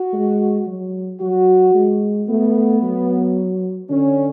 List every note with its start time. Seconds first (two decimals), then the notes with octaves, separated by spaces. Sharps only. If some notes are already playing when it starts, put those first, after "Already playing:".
Already playing: F#4
0.13 G#3
0.67 F#3
1.21 F#3 F#4
1.75 G#3
2.29 A3 B3
2.83 F#3
3.90 D3 C#4